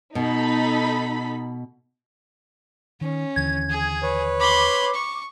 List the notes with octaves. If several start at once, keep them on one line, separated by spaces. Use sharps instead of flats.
B2 D#4 A4 B5
D#3 C#4
D#2 D3 E3 G#6
G#4
B4 C#5
B5 C6 D6
C#6